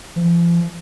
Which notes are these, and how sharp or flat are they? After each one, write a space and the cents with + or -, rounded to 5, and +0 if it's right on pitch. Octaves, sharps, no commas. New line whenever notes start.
F3 -40